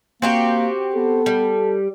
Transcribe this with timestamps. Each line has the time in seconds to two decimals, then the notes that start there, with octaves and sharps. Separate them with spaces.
0.22 A#3 C4 F#4 G4
0.96 B3 A4
1.26 G3